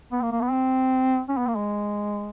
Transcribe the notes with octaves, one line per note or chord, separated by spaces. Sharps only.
B3
A#3
A#3
B3
C4
C#4
B3
A#3
G#3